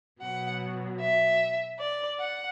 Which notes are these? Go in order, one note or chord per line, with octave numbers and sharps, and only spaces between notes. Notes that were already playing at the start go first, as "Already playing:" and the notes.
B2 F#3 F#5
E5
D5
F#5